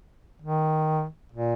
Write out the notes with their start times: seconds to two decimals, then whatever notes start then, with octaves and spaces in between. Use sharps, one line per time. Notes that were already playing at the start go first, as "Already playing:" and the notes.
0.42 D#3
1.32 A#2